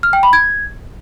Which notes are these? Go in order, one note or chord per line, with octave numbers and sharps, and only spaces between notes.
F6
G5
B5
G#6